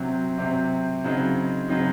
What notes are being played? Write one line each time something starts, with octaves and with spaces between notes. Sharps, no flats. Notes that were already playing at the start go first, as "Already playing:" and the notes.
Already playing: C3 F#3 C4
C3 F#3 C4
C#3 F#3 C4 D#4
C#3 F#3 C4 D#4